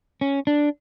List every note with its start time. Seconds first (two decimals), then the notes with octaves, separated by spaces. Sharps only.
0.21 C#4
0.47 D4